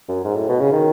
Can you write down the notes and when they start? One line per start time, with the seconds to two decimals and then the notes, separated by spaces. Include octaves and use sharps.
0.08 F#2
0.24 G#2
0.36 A2
0.48 B2
0.60 C#3
0.72 D#3